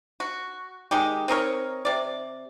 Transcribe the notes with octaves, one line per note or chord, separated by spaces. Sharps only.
F#4
D#3 G#3 D#4 G4
C4 D#4 A#4 C#5
C3 D5